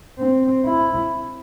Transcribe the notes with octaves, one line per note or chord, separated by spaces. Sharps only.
C4
E4